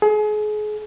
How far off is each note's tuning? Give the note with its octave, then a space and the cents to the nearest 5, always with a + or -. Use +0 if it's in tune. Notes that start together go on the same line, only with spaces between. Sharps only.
G#4 +35